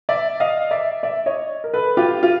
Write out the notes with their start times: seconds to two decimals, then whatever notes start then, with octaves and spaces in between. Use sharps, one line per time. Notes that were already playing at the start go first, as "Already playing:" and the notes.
0.09 D5 E5
0.40 D#5 F5
0.71 D5 E5
1.03 D5 E5
1.26 C#5 D#5
1.64 A#4
1.74 A4 B4
1.97 F4 G4
2.23 F4